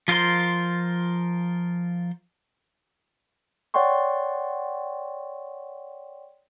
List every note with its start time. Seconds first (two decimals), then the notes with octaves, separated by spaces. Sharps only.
0.08 F3 F4 A#4 C5 C6
3.74 C#5 D5 F#5 G5 C6 C#6